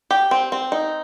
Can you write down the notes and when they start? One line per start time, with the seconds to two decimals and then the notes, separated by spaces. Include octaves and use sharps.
0.11 G4
0.31 C4
0.52 C4
0.72 D#4